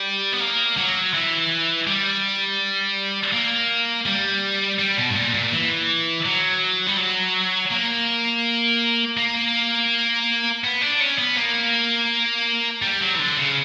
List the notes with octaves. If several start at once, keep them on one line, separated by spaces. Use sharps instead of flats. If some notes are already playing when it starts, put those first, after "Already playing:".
Already playing: G3
B3
A#3
F#3
E3
G3
A#3
G3
G3
B2
G2
A#2
A#2
E3
F#3
G3
F#3
A#3
A#3
B3
D4
C#4
B3
A#3
G3
F#3
E3
D3
C#3